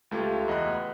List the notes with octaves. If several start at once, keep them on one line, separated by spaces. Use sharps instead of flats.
C#2 A3 F4 G4 G#6
E2 D#5 F#5 B5 F#6